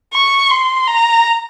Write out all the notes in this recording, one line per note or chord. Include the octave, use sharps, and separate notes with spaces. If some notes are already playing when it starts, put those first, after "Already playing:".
C#6
C6
A#5